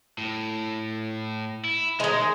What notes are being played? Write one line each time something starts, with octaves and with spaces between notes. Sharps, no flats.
A2
E4
D#3 G#3 D#4